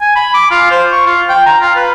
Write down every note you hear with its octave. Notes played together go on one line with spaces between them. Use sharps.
G#5
B5
D6
F4
C5
C#6
F4
G5
A#5
F4
B4